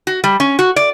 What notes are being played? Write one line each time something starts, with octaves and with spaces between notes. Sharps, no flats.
F#4
G3
C#4
F#4
D5